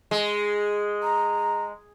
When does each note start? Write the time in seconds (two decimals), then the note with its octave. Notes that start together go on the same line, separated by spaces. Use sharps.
0.11 G#3
1.03 A#5